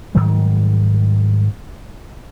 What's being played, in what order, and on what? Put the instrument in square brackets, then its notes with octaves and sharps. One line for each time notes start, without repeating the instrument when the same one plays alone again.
[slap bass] G#2 D#3 F#3 G3